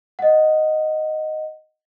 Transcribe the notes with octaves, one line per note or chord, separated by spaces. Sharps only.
D#5 F#5